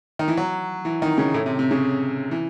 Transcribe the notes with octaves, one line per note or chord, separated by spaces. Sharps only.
D#3
E3
F#3
E3
D#3
C#3
A2
C3
C3
C#3
E3